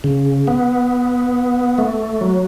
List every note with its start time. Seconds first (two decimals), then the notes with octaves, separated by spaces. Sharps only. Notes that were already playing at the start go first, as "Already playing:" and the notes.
0.04 C#3
0.47 B3
1.78 A3
2.21 F#3